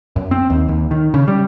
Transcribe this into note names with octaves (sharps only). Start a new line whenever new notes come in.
F#2
C4
D#2
D#2
D#3
C#3
G3